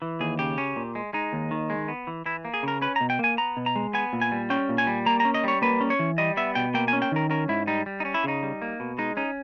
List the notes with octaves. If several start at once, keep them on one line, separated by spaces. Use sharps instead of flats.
E3
D#2 G#4
C#3 G4
C#4
A#2
G#3
G#3 D#4
D#2
D#3
G#3
B3
E3
E3 E4
A#3
G#4
C#3 A#4
C#4 B4
B2 A#5
G5
A#3 G#5
B3 A#5
B2
A#5
G#3
B3 G#5
A#2
G#5
G3
C#4 G5
A#2
G#5
G3
A#3 A#5
C#4 A#5
D#5
G3 C#5
A#3 B4
C#4
C#5
E3
G3 D#5
B3 E5
B2 G5
A#3 G5
G#5
C#4
G5
D#3 A#4
C#4 A#4
G#2 E4
G3 D#4
G3
D#4
C#4
E4
C#3 D#4
G3
A#3
B2
G#3 D#4
C#4 D#4